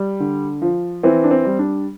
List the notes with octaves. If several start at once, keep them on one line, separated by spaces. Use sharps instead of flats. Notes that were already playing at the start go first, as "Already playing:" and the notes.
Already playing: G3
D3
F3
E3 C4
D4
C4
G3
D4